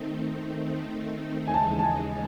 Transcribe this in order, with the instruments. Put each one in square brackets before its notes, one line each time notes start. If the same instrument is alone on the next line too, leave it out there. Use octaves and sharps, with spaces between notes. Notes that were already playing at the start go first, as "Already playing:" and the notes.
Already playing: [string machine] D#3 A3 C4 D#4
D#3 A3 C4 D#4
[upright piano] G#5
[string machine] D#2 C#3 E3 G#3 D#4 [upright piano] A5
[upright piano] A5
G#5